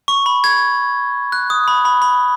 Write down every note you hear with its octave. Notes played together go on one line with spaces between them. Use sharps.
C#6
B5
G#6
F#6
D#6
B5
B5
B5